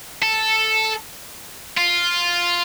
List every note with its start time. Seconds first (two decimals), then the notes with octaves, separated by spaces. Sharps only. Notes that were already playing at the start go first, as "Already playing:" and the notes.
0.22 A4
1.78 F4